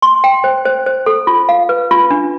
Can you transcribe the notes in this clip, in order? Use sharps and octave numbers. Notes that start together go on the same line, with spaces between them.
C6
G5
C5
C5
C5
A4
F4
F5
B4
F4
D4